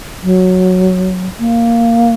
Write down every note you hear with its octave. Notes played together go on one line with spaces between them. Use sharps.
F#3
A#3